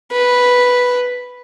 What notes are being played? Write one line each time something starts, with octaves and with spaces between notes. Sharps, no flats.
B4